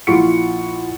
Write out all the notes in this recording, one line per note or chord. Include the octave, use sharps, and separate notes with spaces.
A#1 E4 F4 F#5 C#6 C#7